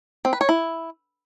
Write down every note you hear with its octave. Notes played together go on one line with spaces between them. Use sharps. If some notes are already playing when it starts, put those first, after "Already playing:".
C4
B4
C#5
E4